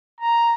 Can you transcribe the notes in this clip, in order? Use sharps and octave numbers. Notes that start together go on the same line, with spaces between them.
A#5